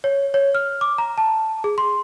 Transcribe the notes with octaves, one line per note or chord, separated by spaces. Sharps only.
C#5
C#5
F6
D6
A#5
A5
G#4
C6